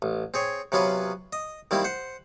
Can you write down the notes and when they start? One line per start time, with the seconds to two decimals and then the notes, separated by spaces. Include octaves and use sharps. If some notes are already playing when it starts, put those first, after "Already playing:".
0.02 A1
0.34 C4 G#4 C#5
0.72 C3 F#3 B3 C#4 F4 B4
1.33 D#5
1.71 D#3 G3 A#3 C4 E4
1.84 C5 F#5